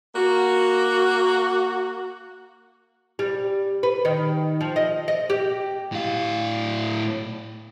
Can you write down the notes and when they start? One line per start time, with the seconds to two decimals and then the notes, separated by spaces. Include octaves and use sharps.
0.15 A#3 F#4
3.19 G3
3.83 B4
4.05 D#3
4.61 F3
4.76 D#5
5.08 D#5
5.30 G4
5.92 A2 F5